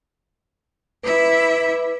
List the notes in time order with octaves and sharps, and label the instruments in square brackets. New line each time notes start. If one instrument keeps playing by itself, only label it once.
[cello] E4 E5 [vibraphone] B4 D6